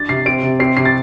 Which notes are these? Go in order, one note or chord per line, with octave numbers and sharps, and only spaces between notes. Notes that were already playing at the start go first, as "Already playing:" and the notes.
Already playing: D4 A6
C3 C7
C4 D7
C3
C4 C7
C3 C7
A6